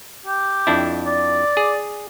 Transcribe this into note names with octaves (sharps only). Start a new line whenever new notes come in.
G4
F2 D4 E4
D5
G#4